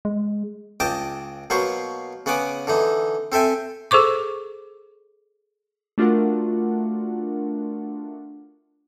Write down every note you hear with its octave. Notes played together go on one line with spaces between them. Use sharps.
G#3
C#2 D#5 G5 A5 D6
B2 F#3 A#3 C5 C#6
C#3 B3 F#5 G#5 D6
D3 E3 D#4
C4 A4 E5 G5 G#5
G#4 A4 C5 C#6 D6
A3 D4 F4 F#4 A#4 F#5